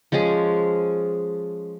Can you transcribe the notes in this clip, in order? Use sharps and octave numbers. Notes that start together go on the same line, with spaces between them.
F3 G#3 C#4 G#4